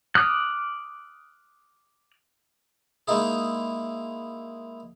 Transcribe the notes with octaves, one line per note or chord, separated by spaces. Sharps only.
D6 D#6 F6 F#6
G#3 A#3 D#4 E4 G#4